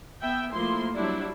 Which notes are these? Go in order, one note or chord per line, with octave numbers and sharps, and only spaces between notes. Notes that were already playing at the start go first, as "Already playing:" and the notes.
B3 E5 G5
F3 A3 A#3 E4 C6
F#3 G3 D4 E4